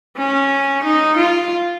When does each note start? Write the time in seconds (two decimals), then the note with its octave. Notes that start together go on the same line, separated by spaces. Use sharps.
0.17 C#4
0.84 D#4
1.17 F4